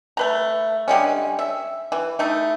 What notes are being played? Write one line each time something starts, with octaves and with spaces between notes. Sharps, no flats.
A3 B4 A#5
D3 G3 G#3 C#4
E5
E3
A3 D#4 E4